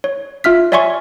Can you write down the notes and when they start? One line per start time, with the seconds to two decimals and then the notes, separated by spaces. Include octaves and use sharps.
0.04 C#5
0.44 F4 E5 F6 B6
0.72 C#5 D5 E5 G#5 C6 C#6